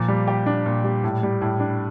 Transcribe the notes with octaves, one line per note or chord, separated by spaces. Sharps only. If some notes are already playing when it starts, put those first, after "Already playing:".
Already playing: A#2 F3
G3
G4
D4
A#2
G3
A2
G3
A2
D4